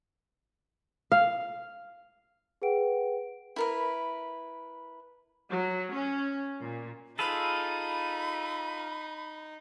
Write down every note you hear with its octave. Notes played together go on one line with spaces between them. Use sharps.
F5
G#4 B4 F#5 G5 D7
E4 A#4 B4
F#3
C#4
A#2
D#4 F4 G#4 A4 B5